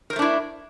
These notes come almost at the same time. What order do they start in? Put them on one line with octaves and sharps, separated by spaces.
A#4 C5 A3 D4 E4